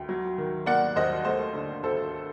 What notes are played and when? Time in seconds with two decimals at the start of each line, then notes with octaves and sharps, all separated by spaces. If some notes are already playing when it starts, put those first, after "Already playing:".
Already playing: D2 G5
0.09 F#3
0.38 D#3
0.66 A#3 D5 F#5
0.96 D#2 C5 D#5
1.25 A3 C5 D#5
1.54 D3
1.83 D2 A4 C5